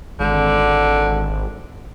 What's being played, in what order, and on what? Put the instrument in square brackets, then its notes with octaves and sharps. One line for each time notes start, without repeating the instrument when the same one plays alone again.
[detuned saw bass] G#1 [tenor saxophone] D3